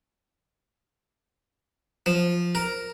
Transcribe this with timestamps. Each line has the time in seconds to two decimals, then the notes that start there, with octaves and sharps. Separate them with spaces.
2.06 F3
2.55 A#4